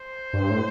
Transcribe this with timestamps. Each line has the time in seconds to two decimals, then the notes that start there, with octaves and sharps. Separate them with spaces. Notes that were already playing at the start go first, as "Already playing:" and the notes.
Already playing: C5
0.33 G2
0.51 A2